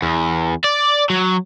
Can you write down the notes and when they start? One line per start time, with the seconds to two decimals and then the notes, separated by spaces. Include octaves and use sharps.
0.03 E2
0.64 D5
1.10 F#3